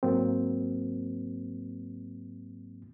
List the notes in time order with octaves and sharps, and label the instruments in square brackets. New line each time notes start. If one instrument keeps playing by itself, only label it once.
[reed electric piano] G#2 F#3 A#3 C4